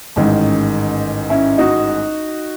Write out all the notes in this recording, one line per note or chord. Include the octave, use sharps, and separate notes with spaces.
A1 G#2 D#3 C#4
C#4 E4
D#4 F#4